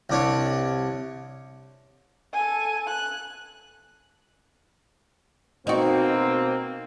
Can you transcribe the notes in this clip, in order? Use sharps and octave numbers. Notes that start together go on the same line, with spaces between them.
C2 D4 C#5
A4 G#5
F#6
B2 A#3 C4 D#4 F#4